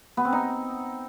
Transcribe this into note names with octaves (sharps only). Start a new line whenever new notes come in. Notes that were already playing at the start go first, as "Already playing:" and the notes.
B3
C4
D#4